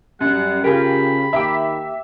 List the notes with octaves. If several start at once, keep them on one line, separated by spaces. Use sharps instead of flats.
F#2 G3 F#5
C#3 F4 G4 G#4 A#4 B5
D#3 A#3 G4 E5 G5